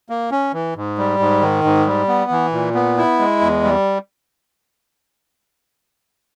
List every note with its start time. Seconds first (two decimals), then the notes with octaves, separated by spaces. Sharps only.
0.09 A#3
0.32 C#4
0.53 E3
0.76 G#2
0.98 G3
1.20 G#2
1.42 D#3
1.64 G#2
1.86 G3
2.08 B3
2.31 E3
2.52 A#2
2.74 B3
2.97 E4
3.19 G#3
3.41 E2
3.63 G3